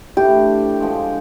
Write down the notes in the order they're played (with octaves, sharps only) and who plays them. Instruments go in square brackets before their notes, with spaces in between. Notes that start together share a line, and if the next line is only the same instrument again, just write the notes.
[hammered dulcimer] A2 E3 A3 D4 [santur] G4
[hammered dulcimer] D3 F3 G#3